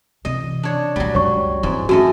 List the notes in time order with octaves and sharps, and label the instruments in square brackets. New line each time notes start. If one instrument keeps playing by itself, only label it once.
[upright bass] C3 E3 [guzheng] D#5
[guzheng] D4 C#5
[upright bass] A1 A#2 [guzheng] F#3 G3
[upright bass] C#2 F#2 [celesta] C#5 C#6
[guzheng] G#2 [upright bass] E3 C4
[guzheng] F#2 A3 D#5 [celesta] F#4